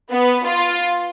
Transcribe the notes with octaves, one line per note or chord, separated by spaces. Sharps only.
B3
F4